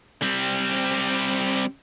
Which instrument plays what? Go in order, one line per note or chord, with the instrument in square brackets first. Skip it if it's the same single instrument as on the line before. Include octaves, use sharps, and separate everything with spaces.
[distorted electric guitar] G3 C4